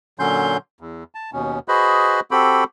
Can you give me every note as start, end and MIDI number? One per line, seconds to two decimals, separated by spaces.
0.19 0.57 46
0.19 0.57 50
0.19 0.57 54
0.19 0.57 61
0.19 0.57 84
0.19 0.57 91
0.81 1.04 40
1.15 1.30 81
1.33 1.59 39
1.33 1.59 47
1.33 1.59 61
1.68 2.20 66
1.68 2.20 68
1.68 2.20 71
1.68 2.20 72
1.68 2.20 75
1.68 2.20 83
2.31 2.64 60
2.31 2.64 66
2.31 2.64 67
2.31 2.64 69
2.31 2.64 79
2.31 2.64 83